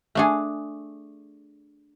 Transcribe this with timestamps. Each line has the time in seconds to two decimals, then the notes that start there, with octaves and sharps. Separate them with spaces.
0.15 A3 D4 G#4